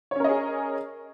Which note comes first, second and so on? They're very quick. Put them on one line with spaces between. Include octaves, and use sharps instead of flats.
C#5 C#4 A#4 D#5 G#4